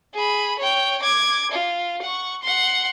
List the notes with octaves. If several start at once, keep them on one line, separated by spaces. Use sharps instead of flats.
G#4 B5
C#5 G5
D6 G#6
F4
F#5 C#6
F#5 C6